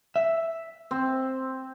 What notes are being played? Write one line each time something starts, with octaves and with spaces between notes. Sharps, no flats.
E5
C4